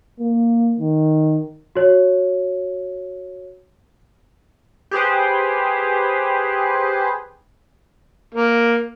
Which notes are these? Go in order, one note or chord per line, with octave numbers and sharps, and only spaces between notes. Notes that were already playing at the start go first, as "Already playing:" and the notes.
A#3
D#3
F#4 C#5
G4 G#4 B4 C5
A#3